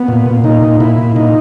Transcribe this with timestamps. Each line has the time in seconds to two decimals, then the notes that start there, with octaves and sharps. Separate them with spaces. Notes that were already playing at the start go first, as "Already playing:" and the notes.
Already playing: B3
0.08 A#2
0.26 A#2
0.44 A#2 D#4
0.62 A#2
0.80 A#2 E4
0.98 A#2
1.16 A#2 D#4